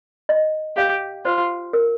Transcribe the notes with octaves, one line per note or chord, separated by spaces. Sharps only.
D#5
G4 F5
F4 C5
A#4